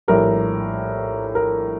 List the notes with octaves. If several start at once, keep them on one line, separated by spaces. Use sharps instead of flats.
A#1 A2 G3 A#4
A#4